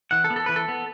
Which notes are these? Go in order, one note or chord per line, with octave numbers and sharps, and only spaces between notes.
E3 F#5
A4
B3
A4
E3 B4
A4
B3